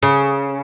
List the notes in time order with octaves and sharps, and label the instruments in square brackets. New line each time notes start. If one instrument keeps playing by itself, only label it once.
[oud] C#3